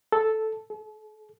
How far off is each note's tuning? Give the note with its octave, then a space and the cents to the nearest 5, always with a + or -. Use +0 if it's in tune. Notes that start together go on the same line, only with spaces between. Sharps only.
A4 -5
A4 -40